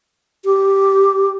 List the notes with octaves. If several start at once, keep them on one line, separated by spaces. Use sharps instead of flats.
G4